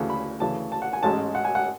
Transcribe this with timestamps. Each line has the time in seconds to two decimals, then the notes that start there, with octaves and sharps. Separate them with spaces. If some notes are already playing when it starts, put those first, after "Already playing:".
Already playing: D2 C#3 E3 A3
0.10 B5
0.40 D2 C#3 E3 A5
0.72 A5
0.82 F#5
0.93 G#5
1.03 A1 G#2 G#3 C#4 A5
1.35 F#5
1.45 G#5
1.55 F#5